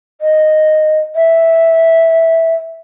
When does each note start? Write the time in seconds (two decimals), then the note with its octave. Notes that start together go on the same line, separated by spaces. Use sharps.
0.21 D#5
1.16 E5